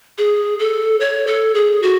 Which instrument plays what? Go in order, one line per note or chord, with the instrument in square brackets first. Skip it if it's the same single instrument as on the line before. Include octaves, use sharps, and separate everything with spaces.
[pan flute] G#4
A4
C#5
A4
G#4
F#4